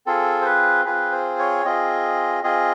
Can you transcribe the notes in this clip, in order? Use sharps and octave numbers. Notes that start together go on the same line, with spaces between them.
C4 F4 G#4 A4
C5
B4
C4 F4 G#4 B4
C5
C#5
C4 F4 G#4 D#5
C4 F4 G#4 D#5